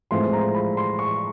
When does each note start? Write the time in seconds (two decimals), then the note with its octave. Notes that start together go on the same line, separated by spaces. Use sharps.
0.11 A2 F3 G#3 C4 C6
0.33 A#5
0.55 B5
0.77 C6
0.99 C#6